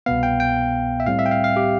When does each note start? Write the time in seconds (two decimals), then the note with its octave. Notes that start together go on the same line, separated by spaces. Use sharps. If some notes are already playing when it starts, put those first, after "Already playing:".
0.06 C2 B2 B3 F5
0.23 G5
0.40 G5
1.00 E5
1.06 A2 G3 C4 F5
1.19 E5
1.26 G5
1.31 F5
1.44 F5
1.56 G4